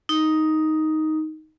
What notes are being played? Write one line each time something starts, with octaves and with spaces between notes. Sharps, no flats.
D#4